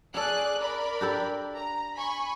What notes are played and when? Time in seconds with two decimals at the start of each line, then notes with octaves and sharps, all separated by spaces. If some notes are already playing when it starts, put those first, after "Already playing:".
0.14 C#4 G#4 A4 D5 F#6
0.58 A#4 D5 B5
1.01 D4 G4 A4
1.56 A#5
1.97 G#5 B5 C#6